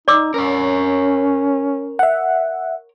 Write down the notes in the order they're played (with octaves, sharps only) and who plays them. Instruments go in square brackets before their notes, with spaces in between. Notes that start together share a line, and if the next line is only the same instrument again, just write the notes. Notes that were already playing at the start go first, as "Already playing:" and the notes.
[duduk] D#4 [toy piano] D5 D6 E6
[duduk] C#4 [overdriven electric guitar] A#4 C#5
[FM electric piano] E5 F#5